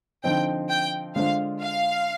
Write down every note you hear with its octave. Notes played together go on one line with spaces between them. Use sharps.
D3 F3 C4 D#4 G5
G5
D3 G#3 D4 F4 C5 F5
F5